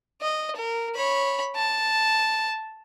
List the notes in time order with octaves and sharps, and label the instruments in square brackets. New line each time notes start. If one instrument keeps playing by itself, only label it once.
[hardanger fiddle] D#5
A#4
C#5 B5
A5